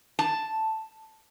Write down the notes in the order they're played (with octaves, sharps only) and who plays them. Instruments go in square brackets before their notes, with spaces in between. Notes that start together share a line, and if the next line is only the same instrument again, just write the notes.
[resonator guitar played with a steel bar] A5